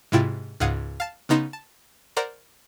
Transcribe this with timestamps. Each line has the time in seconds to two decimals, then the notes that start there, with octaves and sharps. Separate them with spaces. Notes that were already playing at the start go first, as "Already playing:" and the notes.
0.12 G#2 C3 E4 F4 G5 A6
0.60 C#2 G#2 F5 F#5 D#6 G#6
1.00 F5 A5 A6
1.29 C#3 B3 D#4 C6 E7
1.53 A5
2.17 A#4 C5 D5 F#5 A#5 A#6